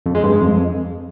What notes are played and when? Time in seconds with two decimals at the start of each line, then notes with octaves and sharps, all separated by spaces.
0.06 F2
0.15 G#3
0.24 G2
0.32 G#3
0.41 F2